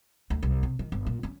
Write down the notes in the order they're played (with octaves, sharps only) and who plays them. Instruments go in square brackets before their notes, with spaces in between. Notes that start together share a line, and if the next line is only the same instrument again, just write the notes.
[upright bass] D2
C2
C3
D#3
G1
A#2
C#4